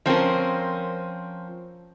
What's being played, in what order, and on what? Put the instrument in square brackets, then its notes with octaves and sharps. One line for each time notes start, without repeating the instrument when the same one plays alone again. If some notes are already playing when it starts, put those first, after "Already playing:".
[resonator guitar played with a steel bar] F3 C4 C#4 A#4